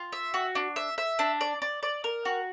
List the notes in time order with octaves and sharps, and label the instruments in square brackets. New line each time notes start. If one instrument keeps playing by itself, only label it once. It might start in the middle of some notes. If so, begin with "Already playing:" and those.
Already playing: [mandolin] F4
E5
F#4
D4
E5
E5
D4
D5
D5
D5
A#4
F#4